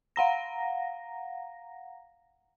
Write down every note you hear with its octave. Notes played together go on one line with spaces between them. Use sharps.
F5 F#5 A#5 A#6